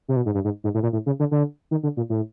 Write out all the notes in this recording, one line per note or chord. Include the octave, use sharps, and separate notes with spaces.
C3
B2
G#2
G2
G#2
G#2
A2
A#2
A2
C#3
D3
D3
D#3
D3
A#2
A2